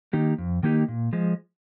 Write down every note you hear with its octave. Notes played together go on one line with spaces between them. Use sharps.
D#3 A#3 D#4 G4
F2
D#3 A#3 D#4 G4
A#2
F3 G#3